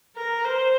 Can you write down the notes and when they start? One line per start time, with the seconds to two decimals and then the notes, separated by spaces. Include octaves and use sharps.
0.16 A#4
0.44 C5